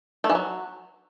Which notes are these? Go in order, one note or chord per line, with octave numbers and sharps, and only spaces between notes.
A3
E3
F#3